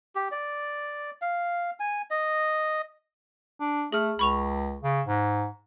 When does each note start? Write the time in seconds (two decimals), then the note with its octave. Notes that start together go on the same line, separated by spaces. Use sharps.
0.15 G4
0.32 D5
1.22 F5
1.80 G#5
2.11 D#5
3.60 D4
3.92 A3 G#4 F6
4.19 C#2 B5 C#6 F7
4.83 C#3
5.07 G#2